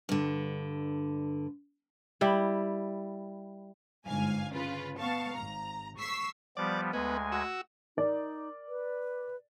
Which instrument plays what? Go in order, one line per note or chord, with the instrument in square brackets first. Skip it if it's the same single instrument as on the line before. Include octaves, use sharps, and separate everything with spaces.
[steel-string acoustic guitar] G2 D3
[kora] G3 E4
[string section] G1 G#2 F5 G#5
C#3 F4 B4
B3 F5 A5 C#6
G#1 A#5
C#6 E6 B6 C7
[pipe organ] F3 G3 B3 [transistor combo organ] D5
[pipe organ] D2 G#3 G#5 [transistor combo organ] B3
[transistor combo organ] F#4 E6
[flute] D#4 [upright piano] A#4 D5
[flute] B4